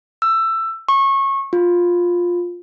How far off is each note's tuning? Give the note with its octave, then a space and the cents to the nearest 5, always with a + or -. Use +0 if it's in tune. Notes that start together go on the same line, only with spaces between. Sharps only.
E6 +15
C#6 -25
F4 +10